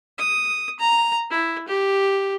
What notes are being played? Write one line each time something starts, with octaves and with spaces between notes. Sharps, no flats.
D#6
A#5
E4
G4